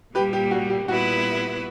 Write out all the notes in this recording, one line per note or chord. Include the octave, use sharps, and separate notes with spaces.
A#2 G3 A#3 G4 B4
G4
F#4
G4
A#2 G3 B3 E4 F#4 B4